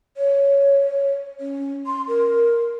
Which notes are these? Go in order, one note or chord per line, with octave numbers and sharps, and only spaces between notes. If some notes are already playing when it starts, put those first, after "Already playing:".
C#5
C#4
C6
A#4